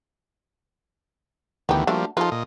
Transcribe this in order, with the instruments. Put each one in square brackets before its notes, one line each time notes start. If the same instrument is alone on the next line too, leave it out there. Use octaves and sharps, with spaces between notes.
[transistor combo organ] D2 D#3 E3 [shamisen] B3 G4
[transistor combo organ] F3 G3 A#3 [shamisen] A3 D4 F#4
[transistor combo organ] F3 D#4 F4 [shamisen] A4 B4
[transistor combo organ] A#2 D#5